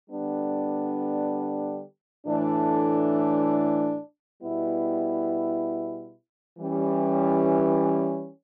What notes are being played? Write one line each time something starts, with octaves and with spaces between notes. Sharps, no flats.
D3 G3 B3 D4
A2 E3 A3 D4
B2 G3 B3 E4
E3 G3 C#4